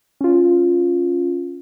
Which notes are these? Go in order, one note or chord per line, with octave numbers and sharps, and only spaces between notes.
C#4 F4